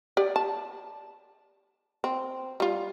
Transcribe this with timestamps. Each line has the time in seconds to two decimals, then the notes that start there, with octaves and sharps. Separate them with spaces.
0.17 G4 D5
0.36 A5
2.04 C4
2.60 G3 F4